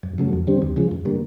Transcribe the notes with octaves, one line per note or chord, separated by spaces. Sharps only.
F#2
C#3 F#3 A3
F2
D3 G3 C4
D2
C#3 F3 G#3
F#2
D3 G3 A#3